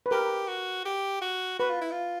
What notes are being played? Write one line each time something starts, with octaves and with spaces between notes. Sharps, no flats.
B4
G4 A#4
F#4
G4
F#4
F#4 B4
F4
E4
F4